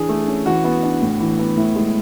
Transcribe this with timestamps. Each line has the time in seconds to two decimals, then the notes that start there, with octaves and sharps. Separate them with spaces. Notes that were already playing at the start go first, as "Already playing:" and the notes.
Already playing: E3 D4 G#4
0.09 A3
0.27 C#4
0.46 E3 F#4
0.64 B3
0.83 D4
1.02 A2
1.20 E3
1.39 B3
1.57 A2 E4
1.76 G#3